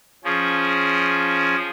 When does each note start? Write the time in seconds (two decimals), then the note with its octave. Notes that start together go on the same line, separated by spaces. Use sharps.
0.24 F3 C#4 G#4